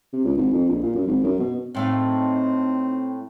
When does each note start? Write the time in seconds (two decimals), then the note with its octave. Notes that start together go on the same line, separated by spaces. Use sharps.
0.13 C3
0.24 C#2
0.37 G#1
0.53 F2
0.69 A#1
0.83 A#2
0.95 F#2
1.07 G#1
1.24 F#2
1.40 B2
1.75 A2 A3 C4 D#4 F5